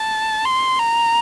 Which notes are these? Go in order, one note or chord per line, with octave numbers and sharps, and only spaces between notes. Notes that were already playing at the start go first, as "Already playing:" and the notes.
Already playing: A5
C6
A#5